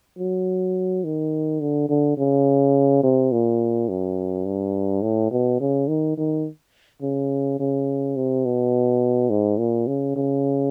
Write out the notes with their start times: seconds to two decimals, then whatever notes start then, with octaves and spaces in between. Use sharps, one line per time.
0.18 F#3
1.04 D#3
1.61 D3
1.89 D3
2.17 C#3
3.03 C3
3.32 A#2
3.89 F#2
4.45 G2
5.02 A2
5.31 B2
5.60 C#3
5.88 D#3
6.17 D#3
7.02 C#3
7.60 C#3
8.16 C3
8.45 B2
9.30 G#2
9.59 A#2
9.87 C#3
10.16 C#3